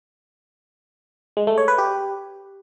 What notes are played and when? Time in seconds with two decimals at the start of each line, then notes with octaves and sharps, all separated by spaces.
1.37 G#3
1.47 A3
1.58 C#5
1.68 B4
1.78 G4